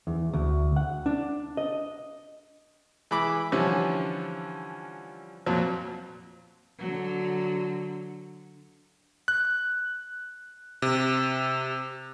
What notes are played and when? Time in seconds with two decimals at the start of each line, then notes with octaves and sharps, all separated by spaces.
0.07 E2
0.33 D2
0.76 F#5
1.06 D4
1.57 D#5
3.11 E3 G#3 B5 D6
3.52 D3 E3 F3 G3 C#4
5.46 F2 A#2 F3 F#3
6.79 D3 F#3
9.28 F#6
10.82 C3